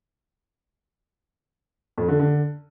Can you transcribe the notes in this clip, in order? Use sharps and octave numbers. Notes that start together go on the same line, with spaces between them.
F2
D3
D3